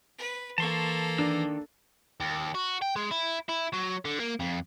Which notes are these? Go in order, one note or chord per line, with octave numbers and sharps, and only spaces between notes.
B4
E3 A#3 A4 A5 C6 C#6
D#3 D4 E6
D#2
F#4
G5
G#3
E4
E4
F#3
D3
A#3
F2